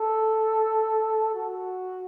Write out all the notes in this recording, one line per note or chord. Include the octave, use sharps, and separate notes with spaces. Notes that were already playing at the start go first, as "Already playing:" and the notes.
Already playing: A4
F#4